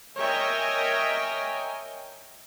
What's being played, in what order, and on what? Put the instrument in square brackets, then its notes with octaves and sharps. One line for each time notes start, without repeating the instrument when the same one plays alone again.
[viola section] A#4 C#5 D#5 E5 G5 G#5